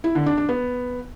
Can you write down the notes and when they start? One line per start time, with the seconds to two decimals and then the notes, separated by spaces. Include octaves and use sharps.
0.04 E4
0.15 D3
0.26 D4
0.37 D4
0.49 B3